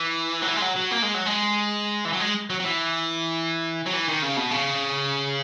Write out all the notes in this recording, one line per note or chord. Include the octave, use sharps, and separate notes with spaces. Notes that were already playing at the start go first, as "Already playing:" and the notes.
Already playing: E3
F#3
E3
G#3
F#3
F#3
A#3
G#3
F#3
G#3
E3
F#3
G#3
F#3
F#3
E3
F#3
E3
D#3
C#3
B2
C#3